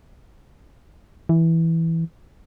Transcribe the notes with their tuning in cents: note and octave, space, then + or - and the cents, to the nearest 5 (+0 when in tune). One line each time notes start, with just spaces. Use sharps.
E3 -5